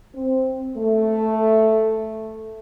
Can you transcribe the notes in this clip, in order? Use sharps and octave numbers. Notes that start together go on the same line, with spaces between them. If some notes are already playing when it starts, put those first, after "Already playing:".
C4
A3